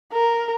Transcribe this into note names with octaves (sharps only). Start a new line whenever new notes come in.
A#4